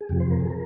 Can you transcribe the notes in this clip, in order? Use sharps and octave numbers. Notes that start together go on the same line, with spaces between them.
G#4
F2 C3 F3 G4
C5
A#4
G#4
A#4